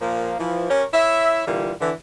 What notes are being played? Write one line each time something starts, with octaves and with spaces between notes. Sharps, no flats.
A#2 F3 A#3
E3 F3
C#4 G4 A#4 C#5
E4 C#5 E5
A#2 D3 E3 G3 F4
D3 E3